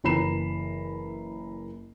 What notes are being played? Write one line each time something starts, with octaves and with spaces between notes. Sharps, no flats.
F#1 E3 A#5 B5 C7 E7